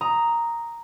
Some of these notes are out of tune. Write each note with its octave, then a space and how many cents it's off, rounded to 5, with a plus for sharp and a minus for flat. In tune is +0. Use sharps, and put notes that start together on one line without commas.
A#5 +0 D#6 +5